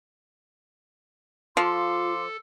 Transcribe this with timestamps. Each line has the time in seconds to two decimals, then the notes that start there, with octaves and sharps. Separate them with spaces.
1.57 F3 F4 A4 F5 C6 D6